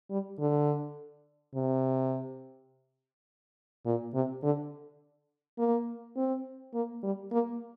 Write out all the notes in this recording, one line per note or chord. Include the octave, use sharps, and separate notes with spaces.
G3
D3
C3
A#2
C3
D3
A#3
C4
A#3
G3
A#3